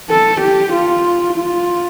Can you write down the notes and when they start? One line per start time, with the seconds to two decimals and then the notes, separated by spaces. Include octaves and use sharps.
0.10 A4
0.41 G4
0.73 F4
1.37 F4